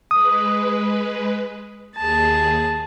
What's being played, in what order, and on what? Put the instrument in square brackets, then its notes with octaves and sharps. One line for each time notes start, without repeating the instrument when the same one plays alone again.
[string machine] G#3 B4 [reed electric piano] D#6
[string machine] D#2 G#4 [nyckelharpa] A5